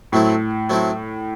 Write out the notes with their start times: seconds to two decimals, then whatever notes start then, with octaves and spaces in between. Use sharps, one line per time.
0.12 A2 F#3 A3 C4 E4
0.70 F#3 A3 C4 E4